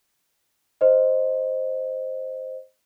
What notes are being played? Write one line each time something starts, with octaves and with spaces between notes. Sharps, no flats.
C5 D#5